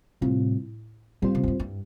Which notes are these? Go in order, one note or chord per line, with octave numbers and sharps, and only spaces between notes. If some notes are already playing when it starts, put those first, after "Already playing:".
A2 C3 G3 C4 F4
A#2 G3 C4 F4 C5
C3
G2
A2
G2